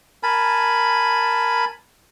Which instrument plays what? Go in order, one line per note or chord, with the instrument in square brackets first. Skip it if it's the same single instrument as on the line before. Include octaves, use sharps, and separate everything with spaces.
[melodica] A#4 G#5 A5 B5